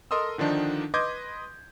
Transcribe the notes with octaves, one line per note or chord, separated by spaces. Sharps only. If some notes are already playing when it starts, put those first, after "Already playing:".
A4 A#4 D#5 C6 D#6 E6
D3 D#3 F3 D4 D#4
B4 D#5 C6 D6 G6 G#6